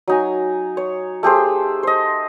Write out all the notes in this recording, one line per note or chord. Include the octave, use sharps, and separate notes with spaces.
F#3 D#4 G#5
C#5
A3 G4 G#4 C5
C5 D#5